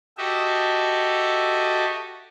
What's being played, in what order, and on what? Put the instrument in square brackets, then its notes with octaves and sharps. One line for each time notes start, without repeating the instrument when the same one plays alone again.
[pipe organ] F#4 G4 A4 D#5 E5